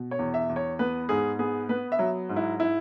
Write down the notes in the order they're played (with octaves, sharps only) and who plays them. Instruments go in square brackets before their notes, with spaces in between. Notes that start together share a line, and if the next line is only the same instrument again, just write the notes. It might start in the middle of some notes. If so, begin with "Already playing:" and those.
Already playing: [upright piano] B2
C#5
E2
E5
E2
C#5
B3 B4
G#2 G#4
B3 G#4
B3 B4
E5
F#3
G#2
E4
E4